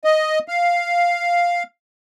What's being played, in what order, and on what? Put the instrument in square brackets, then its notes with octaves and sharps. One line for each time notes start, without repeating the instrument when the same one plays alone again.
[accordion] D#5
F5